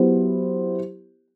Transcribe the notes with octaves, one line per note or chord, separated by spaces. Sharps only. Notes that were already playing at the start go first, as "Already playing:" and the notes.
Already playing: F#3 B3 E4 G4 C5